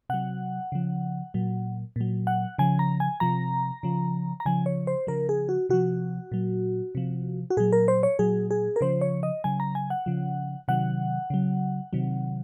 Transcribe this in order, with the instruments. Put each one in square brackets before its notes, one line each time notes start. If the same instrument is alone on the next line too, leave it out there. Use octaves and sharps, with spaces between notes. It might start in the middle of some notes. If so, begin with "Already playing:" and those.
[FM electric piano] C3 F#3 F#5
C#3 F3
A#2 F#3
A#2 F#3
F#5
C#3 F3 G#5
A#5
G#5
C3 F3 A#5
C#3 F3
A#5
C#3 F3 G#5
C#5
C5
C#3 F3 A#4
G#4
F#4
C3 F3 F#4
A#2 F#3
C3 F3
F#4
A#2 F#3 G#4
A#4
C5
C#5
A#2 F#3 G#4
G#4
A#4
C#3 F3 C5
C#5
D#5
C#3 F#3 G#5
A#5
G#5
F#5
C#3 F3
C3 D#3 F#3 F#5
C#3 F#3
C3 D#3 F#3